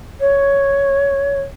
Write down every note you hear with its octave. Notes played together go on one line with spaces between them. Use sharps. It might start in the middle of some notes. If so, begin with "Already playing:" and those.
C#5